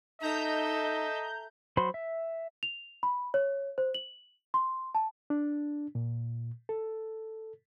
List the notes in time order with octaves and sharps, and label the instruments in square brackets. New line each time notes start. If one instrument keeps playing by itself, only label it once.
[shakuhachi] D#4 [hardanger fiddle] A4 E5 [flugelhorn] D#5 [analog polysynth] A#5 G6
[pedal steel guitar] F#3 F#4 C5 B5 C6
E5
[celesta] F7
B5
C#5
C5
F#7
C6
A5
[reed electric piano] D4
A#2
A4